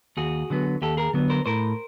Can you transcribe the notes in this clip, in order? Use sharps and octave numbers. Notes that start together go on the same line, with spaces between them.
D#2 F#4 G#4
D3 F#3 B3
D#2 G4 A4
G#4 A#4
D3 F#3 B3
A#4 C5
A2 A#4 C5